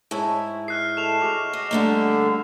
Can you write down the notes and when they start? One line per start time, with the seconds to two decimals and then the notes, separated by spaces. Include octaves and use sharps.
0.11 G#2 G#3 E4 C#5 E5 A5
0.68 D#5 E5 F6 F#6 C7
0.97 A3 E7 F7
1.22 G#3 F#4 D6
1.53 D#5
1.71 D3 G3 A3 A#3